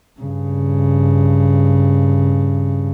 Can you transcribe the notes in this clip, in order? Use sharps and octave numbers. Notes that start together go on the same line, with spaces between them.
G2 C#3